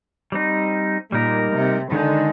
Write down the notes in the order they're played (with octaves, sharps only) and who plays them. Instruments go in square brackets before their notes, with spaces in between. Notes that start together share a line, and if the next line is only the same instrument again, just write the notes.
[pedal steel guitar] G3 C4 D#4
[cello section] A#2 [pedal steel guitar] G3 A#3 D#4 A#4
[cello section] C3
[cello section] D3 [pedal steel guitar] D#3 G#3 D#4